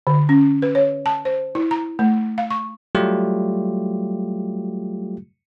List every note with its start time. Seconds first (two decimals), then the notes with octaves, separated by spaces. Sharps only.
0.07 D3
0.29 C#4
0.62 B4
0.75 C#5
1.06 A5
1.25 C5
1.55 E4
1.71 A#5
1.99 A3
2.38 F5
2.51 C#6
2.95 F#3 G3 A3 F4 G4